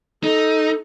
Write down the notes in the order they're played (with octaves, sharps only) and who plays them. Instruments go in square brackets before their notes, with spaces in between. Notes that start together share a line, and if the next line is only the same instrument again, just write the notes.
[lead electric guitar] D#4 [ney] A4